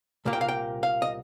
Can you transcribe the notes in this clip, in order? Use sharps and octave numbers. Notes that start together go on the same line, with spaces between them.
C2 A#2 A#3
G5
F5
G5
F5
D#5